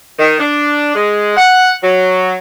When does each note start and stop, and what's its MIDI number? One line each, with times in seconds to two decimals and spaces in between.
0.19 0.38 51
0.40 0.94 62
0.95 1.35 56
1.37 1.71 78
1.82 2.35 54